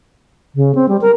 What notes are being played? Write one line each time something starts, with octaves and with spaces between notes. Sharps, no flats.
C#3
C4
G3
A#4